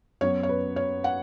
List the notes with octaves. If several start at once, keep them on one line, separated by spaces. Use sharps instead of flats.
F#2 F#3 B3 C#5
C#5
B4
C#5
F#5